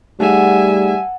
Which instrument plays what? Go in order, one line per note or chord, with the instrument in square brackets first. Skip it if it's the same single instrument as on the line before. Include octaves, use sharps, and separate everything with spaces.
[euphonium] G3 [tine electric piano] A3 D#4 G#4 [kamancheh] E5 G#5 [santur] F#5 A5